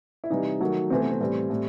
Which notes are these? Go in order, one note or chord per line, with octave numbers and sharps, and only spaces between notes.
E4
C3 E3 G3 D#4
D#3 F#3 A3
C3 E3 A3 C4
B3
C4
A2 E3 G3
A2 G3